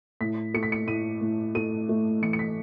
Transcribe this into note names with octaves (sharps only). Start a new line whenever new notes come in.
A2 B6
A3 C#7
B6
C#7
A2 D#7
A2
A3 D#7
A3
E3 C#7
C#7
B6